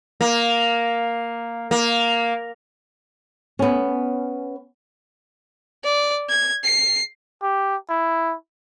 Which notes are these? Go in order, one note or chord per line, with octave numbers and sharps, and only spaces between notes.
A#3
A#3
B3 C#4
D5
G#6
C7
G4
E4